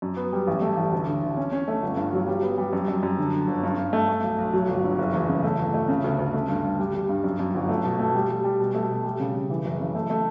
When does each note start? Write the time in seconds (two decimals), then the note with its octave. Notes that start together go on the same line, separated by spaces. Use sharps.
0.02 F#2
0.17 B3
0.33 G3
0.47 A1
0.62 A3
0.77 A1
0.92 D2
1.07 D3
1.23 D3
1.37 C#4
1.52 C#4
1.68 A3
1.83 G1
1.97 G2
2.13 F#3
2.28 G3
2.42 B3
2.58 G3
2.73 F#2
2.88 F#2
3.03 F#2
3.18 D3
3.34 D3
3.48 G1
3.64 G2
3.78 G2
3.93 A3
4.08 A3
4.23 B1
4.38 B1
4.53 F#3
4.68 G1
4.84 G2
4.98 F#1
5.14 E2
5.29 C#3
5.43 A3
5.59 G1
5.74 A3
5.88 C#3
6.04 D2
6.19 D2
6.34 A3
6.49 G2
6.63 G2
6.79 G3
6.94 G3
7.09 G2
7.24 F#2
7.39 F#2
7.55 G1
7.69 A3
7.84 B2
7.99 A3
8.15 G3
8.29 G3
8.44 G3
8.59 B2
8.75 A3
8.90 B2
9.04 G3
9.20 C#3
9.34 C#3
9.50 E3
9.65 F#1
9.80 C#3
9.95 A3
10.10 A3